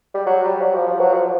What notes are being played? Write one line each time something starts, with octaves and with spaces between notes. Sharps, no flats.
G3
F#3
G3
F#3
F3
F3
F#3
F3